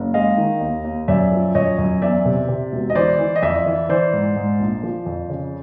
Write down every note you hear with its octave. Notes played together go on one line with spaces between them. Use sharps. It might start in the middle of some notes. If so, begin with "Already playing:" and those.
Already playing: F#1
G#3 D#5 F5
D#3
D#2
D#2
F#2 D5 E5
F3
F#2 C#5 D#5
F#2
E2 D5 E5
C3
C3
E1
D#5
E3 C5 D5
E3
D#5
F2 D5 E5
E3
E3 C5 D5
G#2
G#2
A#1
F3
F2
C#3